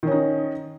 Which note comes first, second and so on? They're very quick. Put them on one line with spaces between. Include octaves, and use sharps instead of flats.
D#3 C#4 D#4